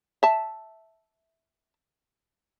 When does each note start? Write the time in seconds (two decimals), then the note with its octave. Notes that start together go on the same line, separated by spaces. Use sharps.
0.23 E5 A5